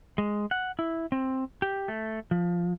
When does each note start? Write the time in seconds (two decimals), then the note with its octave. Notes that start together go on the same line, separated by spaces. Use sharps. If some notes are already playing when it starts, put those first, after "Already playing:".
0.18 G#3
0.51 F#5
0.79 E4
1.12 C4
1.62 G4
1.88 A3
2.31 F3